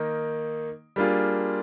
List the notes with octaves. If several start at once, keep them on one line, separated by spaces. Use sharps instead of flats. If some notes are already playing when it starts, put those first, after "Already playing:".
Already playing: D#3 A#3 D#4
G3 A#3 D4 F4 G#4